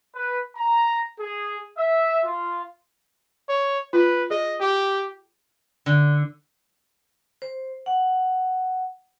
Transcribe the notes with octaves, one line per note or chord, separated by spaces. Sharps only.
B4
A#5
G#4
E5
F4
C#5
F4 B4
G#4 D#5
G4
D3
C5
F#5